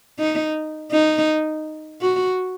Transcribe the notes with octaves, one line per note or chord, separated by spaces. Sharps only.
D#4
D#4
F#4